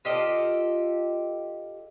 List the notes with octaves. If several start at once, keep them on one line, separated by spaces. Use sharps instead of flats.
F4 G4 A4 D#5